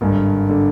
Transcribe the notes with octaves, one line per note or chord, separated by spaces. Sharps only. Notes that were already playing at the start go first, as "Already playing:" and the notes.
G#1 G2 D3
D3